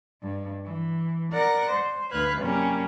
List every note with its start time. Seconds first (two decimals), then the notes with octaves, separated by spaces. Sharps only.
0.21 G2
0.64 E3
1.31 A#4 D5 F#5 F#6 A#6
1.69 C5
2.11 D2 B4 F5 F#6 G#6
2.40 F#2 C3 G3 A#3 C#4